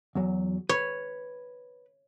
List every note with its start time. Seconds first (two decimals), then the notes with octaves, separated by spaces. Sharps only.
0.15 E2 F#3
0.69 B4 C#5